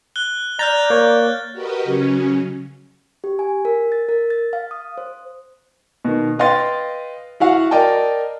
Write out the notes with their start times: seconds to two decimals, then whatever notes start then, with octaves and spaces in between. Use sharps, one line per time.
0.16 F#6 G7
0.59 D5 A#5 F6 G6 A6
0.90 A#3 C#5
1.52 F#4 G4 A#4 B4 D#5
1.84 C#3 F#3 C#4
3.24 G4
3.39 G#5
3.65 A#4
3.92 A6
4.09 A#4
4.30 A6
4.53 F5
4.71 D#6
4.98 C5
6.05 B2 D#3
6.39 B4 D#5 F5 G5 C6 A6
7.40 E4 F#4 F5 F#5
7.71 A#4 D5 D#5 G5 A5